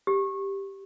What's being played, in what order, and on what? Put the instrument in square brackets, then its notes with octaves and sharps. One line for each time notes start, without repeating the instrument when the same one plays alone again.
[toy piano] G4